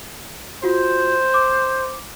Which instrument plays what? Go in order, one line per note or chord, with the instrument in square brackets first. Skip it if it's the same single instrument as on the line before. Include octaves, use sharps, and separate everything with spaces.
[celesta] F4 F#4 [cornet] C5
[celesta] D6